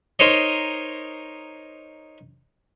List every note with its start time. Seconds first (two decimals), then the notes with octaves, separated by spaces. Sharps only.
0.19 D#4 A#4 C5 C#5 D#5